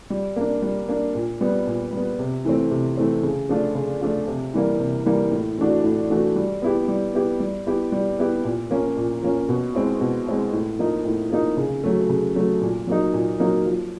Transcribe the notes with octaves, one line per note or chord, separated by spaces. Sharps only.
G3
A#3 D4
G3
A#3 D4
A#2
G3 B3
A#2
G3 B3
C3
E3 A3 C4
C3
E3 A3 C4
C#3
F3 A3 D4 F4
C#3
F3 A3 D4 F4
C3
E3 G3 A#3
C3
E3 G3 A#3
A2
E3 A3 D4 F#4
A2
E3 A3 D4 F#4
G3
B3 E4 G4
G3
B3 E4 G4
G3
B3 E4 G4
G3
B3 E4 G4
A#2
F3 A#3 C#4
A#2
F3 A#3 C#4
B2
G#3 C4 E4
B2
G#3 C4 E4
A2
F3 A#3 D#4
A2
F3 A#3 D#4
C#3
F#3 A3
C#3
F#3 A3
A#2
F#3 A#3 D#4
A#2
F#3 A#3 D#4
F3